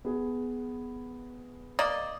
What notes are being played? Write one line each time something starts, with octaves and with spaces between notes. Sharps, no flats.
B3 G#4
A#3 D5 D#5